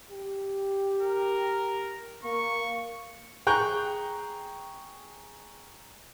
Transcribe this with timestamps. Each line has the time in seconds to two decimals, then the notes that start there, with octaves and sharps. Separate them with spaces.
0.11 G4
1.02 A#4
2.24 A#3 C#6
3.47 G#4 G5 A#5 C#6 F#6 G6